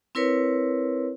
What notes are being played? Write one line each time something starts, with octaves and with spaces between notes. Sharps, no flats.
C4 E4 A#4 B4 C#5